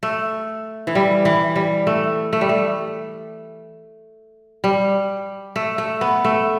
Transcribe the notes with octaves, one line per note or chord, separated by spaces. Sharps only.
A3
E3
G3
E3
G3
A3
A3
G3
A3
G3
A3
A3
B3
A3